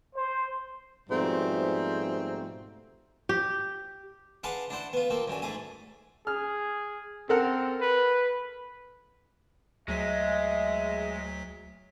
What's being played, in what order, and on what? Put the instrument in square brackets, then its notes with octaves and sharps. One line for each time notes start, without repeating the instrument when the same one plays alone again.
[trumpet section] C5
[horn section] G#2 B2 F3 G3 A3 C4
[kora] G4
[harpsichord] D4 G#4 B4 F5 F#5 C6
D4 E4 C5 F#5
B3 F4
F3 A#3 C4
F#2 D3 G#5
G#2 A3 G#4 G#5
[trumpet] G#4 [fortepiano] F6
[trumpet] C4 [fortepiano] A4 A#4 F#5
[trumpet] B4
[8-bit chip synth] D2 F#3 B6 [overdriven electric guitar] G#3 [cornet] E5